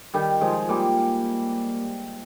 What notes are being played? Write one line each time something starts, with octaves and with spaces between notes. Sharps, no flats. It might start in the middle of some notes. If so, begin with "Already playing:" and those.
D#3 G3
F3 G#3
G3 A#3